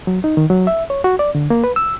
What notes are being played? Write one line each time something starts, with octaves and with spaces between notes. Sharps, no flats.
F#3
D#4
D#3
F#3
E5
C#5
F#4
D5
D3
A#3
B4
E6